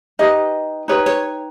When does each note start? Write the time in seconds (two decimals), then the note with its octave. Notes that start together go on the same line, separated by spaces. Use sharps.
0.19 D#4 G4 B4 D#5
0.88 D#4 G4 B4 C#5
1.06 C#5